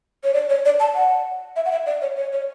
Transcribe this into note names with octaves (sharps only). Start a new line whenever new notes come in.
C#5
D5
C#5
D5
A5
F#5
E5
F#5
E5
D5
C#5
C#5
C#5